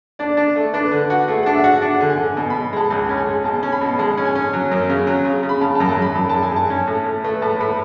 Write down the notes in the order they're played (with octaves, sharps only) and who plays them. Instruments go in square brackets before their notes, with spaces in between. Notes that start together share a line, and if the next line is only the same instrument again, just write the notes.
[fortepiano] D4 [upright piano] D5
[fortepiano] D4
A3
[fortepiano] D4 [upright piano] B4
[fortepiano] D3
F#4
[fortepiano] A3 [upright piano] G#4
[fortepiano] D4 [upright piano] F#5
[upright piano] E5
[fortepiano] F#4
[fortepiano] D4 [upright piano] F#5
[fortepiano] D3
[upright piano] G#5
[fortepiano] D3
B2
[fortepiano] B2 [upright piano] B5
[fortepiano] G#3 [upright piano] A5
[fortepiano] C#2 [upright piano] G#5
[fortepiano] C#4
[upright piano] G#5
[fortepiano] G#3
[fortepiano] B2 [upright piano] A5
[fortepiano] C#4
[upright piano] B5
[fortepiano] B2
[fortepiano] G#3 [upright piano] A5
[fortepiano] C#4
[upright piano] G#5
[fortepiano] C#4
F#3
F#2
C#3
F#3
C#3
C#3
[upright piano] B5
[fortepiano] C#3 [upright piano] A5
[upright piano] A5
[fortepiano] F#2
[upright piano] A5
[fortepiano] F#2 [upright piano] B5
[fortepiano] F#2 [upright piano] A5
[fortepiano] F#2 [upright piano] A5
[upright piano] G#5
[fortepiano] F#2
[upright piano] A5
[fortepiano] C#4
A2
A2
[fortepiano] A3 [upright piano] B4
[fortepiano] A2 [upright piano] A5
[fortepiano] A2 [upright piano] B5